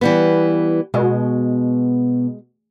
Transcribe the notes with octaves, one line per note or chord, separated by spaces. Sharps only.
E3 G3 B3
B2 G#3